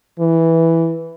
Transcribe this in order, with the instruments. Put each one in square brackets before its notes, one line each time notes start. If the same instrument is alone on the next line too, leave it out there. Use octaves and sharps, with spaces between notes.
[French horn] E3